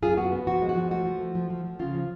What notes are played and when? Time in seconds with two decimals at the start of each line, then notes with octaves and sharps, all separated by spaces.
0.03 F#2 F4 G#4
0.17 B3 F#4
0.32 B3
0.47 F3 F#4
0.62 G#3
0.69 F#4
0.76 F3
0.91 A3 F#4
1.06 F3
1.20 A3
1.35 F3
1.50 F3
1.65 F3
1.79 C#3 F4
1.94 F3